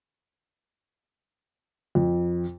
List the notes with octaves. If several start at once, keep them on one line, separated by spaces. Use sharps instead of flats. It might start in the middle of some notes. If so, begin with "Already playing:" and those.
F2